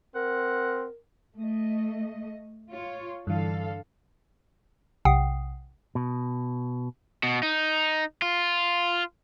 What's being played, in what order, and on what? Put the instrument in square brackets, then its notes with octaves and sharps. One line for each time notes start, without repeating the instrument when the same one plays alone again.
[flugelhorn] C4 [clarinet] A#4 [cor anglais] F#5
[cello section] A3 D#5
F4 C#5
[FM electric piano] G2 E3 [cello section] D3 A4 F5
[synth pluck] B1 C3 F#5 G5 D#6 C7
[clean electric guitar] B2
[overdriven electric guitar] B2
D#4
F4